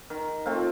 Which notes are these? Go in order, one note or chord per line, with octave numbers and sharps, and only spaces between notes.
D#3
A3 C4 F4